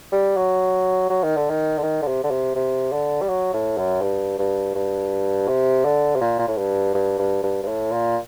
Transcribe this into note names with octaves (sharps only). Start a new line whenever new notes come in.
G3
F#3
F#3
D#3
D3
D#3
D3
D#3
D3
C3
D3
C3
C3
D3
G3
F#3
A2
F#2
G2
G2
G2
C3
D3
C3
A#2
A#2
A2
G2
G2
G2
G2
G2
A2
A#2